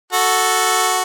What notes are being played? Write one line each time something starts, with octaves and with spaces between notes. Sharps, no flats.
F#4 A4